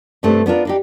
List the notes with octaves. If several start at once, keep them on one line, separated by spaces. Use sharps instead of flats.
G2 C3 A3 C4 D4
B3 D4 F4 A#4
D4 D#4 G4